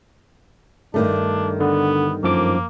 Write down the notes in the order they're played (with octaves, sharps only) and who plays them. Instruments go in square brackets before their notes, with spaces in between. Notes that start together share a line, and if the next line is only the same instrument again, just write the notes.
[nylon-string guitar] G2 D#3 A3 [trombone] D4
[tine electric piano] D3 [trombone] B3
[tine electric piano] F#2 F3 D6 [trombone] A#3